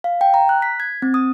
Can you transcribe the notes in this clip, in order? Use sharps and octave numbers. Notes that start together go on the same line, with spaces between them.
F5
G5
A#5
F#6
B6
G#6
C4
D#6